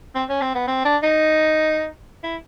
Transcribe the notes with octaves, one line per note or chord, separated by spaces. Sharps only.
C4
C#4
C4
B3
C4
D4
D#4
E4